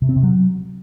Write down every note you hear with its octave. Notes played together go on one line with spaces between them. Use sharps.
C3
C4
C3
F#3